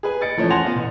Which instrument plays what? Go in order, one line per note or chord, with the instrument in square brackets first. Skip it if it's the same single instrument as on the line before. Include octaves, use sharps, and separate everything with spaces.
[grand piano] G#4 B4 G#5
D#5 A6 C#7 D7
E3 F3 A3 C#4
F#5 G#5 A5 C6 A#6 F7
B3 F4
A1